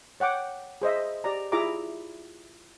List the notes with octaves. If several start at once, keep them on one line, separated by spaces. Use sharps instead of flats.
C#5 F#5 G5 D6
G#4 C5 D#5 E5
G4 D5 A#5
E4 F4 G#4 E5 A#5 D6